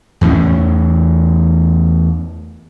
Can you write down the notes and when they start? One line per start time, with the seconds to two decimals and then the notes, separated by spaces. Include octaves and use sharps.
0.21 E2 A2 E3 C#4